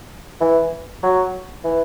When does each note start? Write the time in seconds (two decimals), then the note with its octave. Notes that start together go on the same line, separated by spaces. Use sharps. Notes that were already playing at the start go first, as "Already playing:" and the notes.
0.41 E3
1.03 F#3
1.64 E3